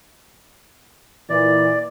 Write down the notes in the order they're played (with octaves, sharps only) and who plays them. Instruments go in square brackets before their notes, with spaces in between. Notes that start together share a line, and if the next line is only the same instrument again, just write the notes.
[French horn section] A#2 E3 [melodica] D5